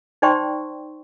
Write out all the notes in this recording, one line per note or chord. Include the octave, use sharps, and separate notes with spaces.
D#4 C5 D5 G5 C6 C#6